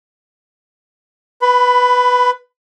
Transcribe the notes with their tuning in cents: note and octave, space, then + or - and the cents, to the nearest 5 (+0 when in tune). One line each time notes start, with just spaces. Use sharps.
B4 +0 B5 +25